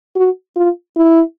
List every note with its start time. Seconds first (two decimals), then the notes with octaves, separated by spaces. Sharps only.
0.16 F#4
0.56 F4
0.96 E4